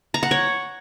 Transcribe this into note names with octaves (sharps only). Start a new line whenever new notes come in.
A#5
F#5
C#5